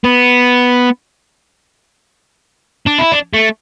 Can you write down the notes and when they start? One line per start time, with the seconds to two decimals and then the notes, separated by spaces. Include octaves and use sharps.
0.04 B3
2.86 D4
2.98 E4
3.12 D4
3.34 A3